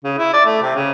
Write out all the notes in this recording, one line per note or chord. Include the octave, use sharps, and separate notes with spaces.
C#3
E4
D5
A3
C3
C#3